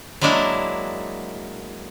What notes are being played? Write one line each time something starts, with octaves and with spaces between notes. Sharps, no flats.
F#3 G#3 A#3 D4 E4